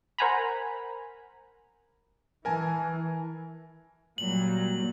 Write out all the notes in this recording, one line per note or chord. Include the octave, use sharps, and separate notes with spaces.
A#4 C5 F#5 G#5 A#5 B5
E3 A#4 G#5 A5
A#2 F#3 G3 F#7